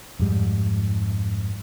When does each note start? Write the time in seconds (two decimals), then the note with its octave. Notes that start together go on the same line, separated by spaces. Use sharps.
0.19 F2 G#2 G3